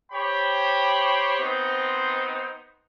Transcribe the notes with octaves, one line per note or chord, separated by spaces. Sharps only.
G4 C5 C#5 G5 B5
B3 C4 D#4 C5